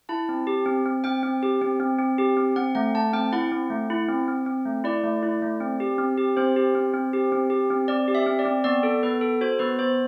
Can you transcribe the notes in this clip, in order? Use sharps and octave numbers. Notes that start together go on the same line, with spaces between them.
E4 A5
C4
G4
C4
C4
C4 G5
C4
G4
C4
C4
C4
G4
C4
C4 F#5
A3 F#5
A3 A5
C4 G5
E4 F#5
C4
A3
E4
C4
C4
C4
A3
E4 D5
A3
E4
A3
C4
G4
C4
G4
C4 C5
G4
C4
C4
G4
C4
G4
C4
C4 D5
G4
E5
C4
D5
C4
B3 D5
A4
B3 B4
A4
F#4 C5
B3 B4
B3 C5